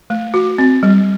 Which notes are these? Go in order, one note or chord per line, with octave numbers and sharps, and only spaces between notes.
A3
F#4
C4
G3